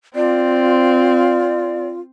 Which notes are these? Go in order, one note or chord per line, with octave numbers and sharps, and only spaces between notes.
C4 F4 D5